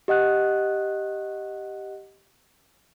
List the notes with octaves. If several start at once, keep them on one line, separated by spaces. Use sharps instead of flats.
G4 D#5 F#5 F#6